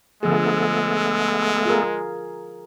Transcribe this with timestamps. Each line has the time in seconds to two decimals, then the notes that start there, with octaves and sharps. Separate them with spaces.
0.23 D3 F3 G#3 A3 B3 G#4 A4
1.66 F4 G#4 A#4